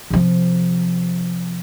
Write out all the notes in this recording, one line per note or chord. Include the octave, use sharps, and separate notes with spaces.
C3 F3